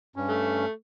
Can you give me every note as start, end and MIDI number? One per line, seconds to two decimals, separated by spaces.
0.16 0.66 43
0.16 0.66 61
0.29 0.70 57